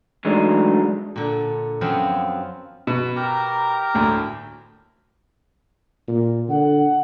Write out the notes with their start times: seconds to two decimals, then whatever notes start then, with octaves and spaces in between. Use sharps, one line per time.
0.25 E3 F#3 G#3 A3 D4 D#4
1.16 A#2 D3
1.81 F#2 F3 F#3 B3 C4 F4
2.87 B2
3.16 G4 A#4 A#5
3.95 D2 A2
6.08 A#2
6.49 D3 F#5